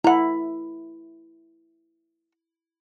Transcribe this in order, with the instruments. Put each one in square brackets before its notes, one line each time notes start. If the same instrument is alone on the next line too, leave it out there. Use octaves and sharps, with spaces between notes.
[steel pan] E4 [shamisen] F#5 A#5